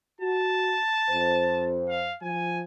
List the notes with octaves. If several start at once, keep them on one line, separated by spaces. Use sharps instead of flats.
F#4 A5
F2 C5
F5
F3 G#5